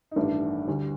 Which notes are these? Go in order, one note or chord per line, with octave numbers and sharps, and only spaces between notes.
D#4
A1 G2 D#3 A3 D4
D2 D3 G3 D4